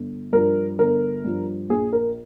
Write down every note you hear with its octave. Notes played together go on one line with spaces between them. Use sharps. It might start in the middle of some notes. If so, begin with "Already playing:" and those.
Already playing: G1
G2 F3 A#4
G1 A#4
G2 F3
A#1 G#4
A#4